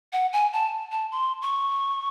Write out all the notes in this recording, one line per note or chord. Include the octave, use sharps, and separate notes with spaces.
F#5
G#5
A5
A5
C6
C#6